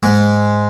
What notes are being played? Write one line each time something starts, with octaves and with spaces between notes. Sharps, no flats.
G#2 G#3